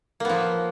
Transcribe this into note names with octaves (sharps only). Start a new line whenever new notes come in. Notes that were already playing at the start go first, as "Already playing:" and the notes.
F3 A#3 B3